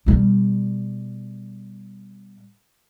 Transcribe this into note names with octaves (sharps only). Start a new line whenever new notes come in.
B2 G3